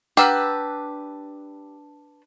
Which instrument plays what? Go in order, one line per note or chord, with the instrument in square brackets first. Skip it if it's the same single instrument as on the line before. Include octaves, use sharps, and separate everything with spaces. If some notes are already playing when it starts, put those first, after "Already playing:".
[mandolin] D4 B4 E6 [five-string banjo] G4 [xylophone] F#5 A#5 F6